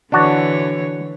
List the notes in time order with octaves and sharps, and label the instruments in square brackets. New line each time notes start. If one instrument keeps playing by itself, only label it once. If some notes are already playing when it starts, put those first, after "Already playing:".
[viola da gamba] D3 E3 C#5 [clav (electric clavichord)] D4 F#4 D5